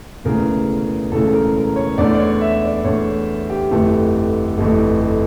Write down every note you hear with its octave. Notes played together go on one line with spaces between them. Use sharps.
E1 D2 C#3 E3 A#4
E1 D2 C#3 E3 A4
A4
A#4
A#4
C#5
E2 D3 A3 D5
D5
C#5
E5
D5
E2 D3 A3 C#5
G4
G1 F2 E3 A3
G1 F2 E3 A3